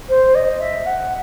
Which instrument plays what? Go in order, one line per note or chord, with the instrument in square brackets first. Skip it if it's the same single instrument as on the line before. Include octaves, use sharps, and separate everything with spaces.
[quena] C5
D#5
E5
F#5